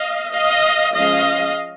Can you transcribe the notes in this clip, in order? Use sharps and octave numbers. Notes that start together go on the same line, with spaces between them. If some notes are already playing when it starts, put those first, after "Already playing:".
Already playing: D#5 F5
D#5 F5
F3 G#3 C#4 D#5 F5